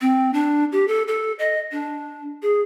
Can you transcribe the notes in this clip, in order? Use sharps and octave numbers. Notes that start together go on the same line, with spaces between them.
C4
D4
G4
A4
A4
D#5
D4
G#4